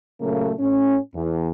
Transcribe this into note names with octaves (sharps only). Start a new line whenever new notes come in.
A#2 C#3 F#3 A3 A#3
A2 C#4
E2